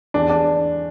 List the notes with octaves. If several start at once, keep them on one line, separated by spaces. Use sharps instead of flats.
E2 D4
D4